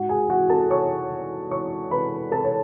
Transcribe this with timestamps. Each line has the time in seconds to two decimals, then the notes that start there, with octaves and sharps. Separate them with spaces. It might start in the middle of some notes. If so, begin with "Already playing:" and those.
Already playing: G#2 F#4 F#5
0.09 G#4 G#5
0.30 E3 F#4 F#5
0.50 A4 A5
0.70 E3 C#5 C#6
1.11 E3
1.50 E3 C#5 C#6
1.91 E3 B4 B5
2.32 E3 A4 A5
2.44 C#5